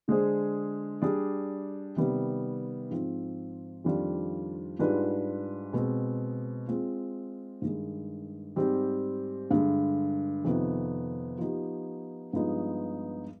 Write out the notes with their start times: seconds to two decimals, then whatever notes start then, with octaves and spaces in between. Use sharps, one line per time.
0.08 D3 G#3 D4 G#4 C5
1.02 G3 D4 G#4 D5
1.96 C3 D#3 G3 B3
2.90 G#2 F3 C4
3.84 F2 D#3 G3 D4 F4
4.79 G#2 G3 D4 F4 B4
5.73 B2 G#3 C4
6.67 G#3 C4 F4
7.62 G2 D#3 G#3
8.56 G#2 G3 C4 G4
9.51 G2 D3 G#3
10.44 F2 C3 D#3 B3 D#4
11.38 F3 B3 D#4 G4
12.33 G2 F3 G#3 B3 D#4